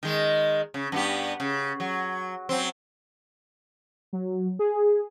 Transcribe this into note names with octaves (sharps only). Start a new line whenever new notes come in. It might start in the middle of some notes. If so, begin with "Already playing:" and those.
D#3 G#3
C#3
G2 B3 G4
C#3
F#3
F#3 C4
F#3
G#4